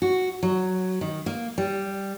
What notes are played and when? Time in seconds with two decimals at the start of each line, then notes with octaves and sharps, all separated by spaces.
0.02 F#4
0.43 F#3
1.01 D#3
1.26 A#3
1.58 G3